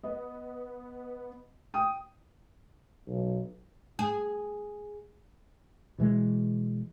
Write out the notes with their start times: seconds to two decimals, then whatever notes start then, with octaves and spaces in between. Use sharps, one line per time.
0.03 B3 D#5
1.74 G5 D#6
3.08 B1
3.99 G#4
5.98 B2 E3 G#3